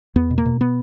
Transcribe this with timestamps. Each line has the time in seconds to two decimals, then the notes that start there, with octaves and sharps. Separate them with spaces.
0.16 E2 B3
0.31 B2
0.38 A#3
0.46 B2
0.61 B3